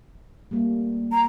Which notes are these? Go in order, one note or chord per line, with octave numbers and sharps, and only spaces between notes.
G3 A3 A#3
A#5